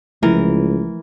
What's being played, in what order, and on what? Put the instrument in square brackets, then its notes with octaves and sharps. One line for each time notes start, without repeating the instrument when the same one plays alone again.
[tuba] C#2 [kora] E3 A#4 [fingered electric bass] F3 A3